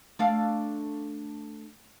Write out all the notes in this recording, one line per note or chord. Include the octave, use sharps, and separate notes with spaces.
A3 D4 F5